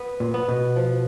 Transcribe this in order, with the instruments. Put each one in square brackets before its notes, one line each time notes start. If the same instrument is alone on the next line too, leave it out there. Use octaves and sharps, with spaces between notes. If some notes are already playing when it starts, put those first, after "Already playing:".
Already playing: [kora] B3
[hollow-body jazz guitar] A#2
[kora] B3
[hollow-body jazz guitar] B2
[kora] F3